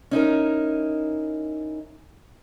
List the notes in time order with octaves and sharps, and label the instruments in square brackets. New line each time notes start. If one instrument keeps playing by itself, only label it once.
[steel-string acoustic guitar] C#4 D#4 E4 A#4